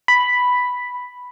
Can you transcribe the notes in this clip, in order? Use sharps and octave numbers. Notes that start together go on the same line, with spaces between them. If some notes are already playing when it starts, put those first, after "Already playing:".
B5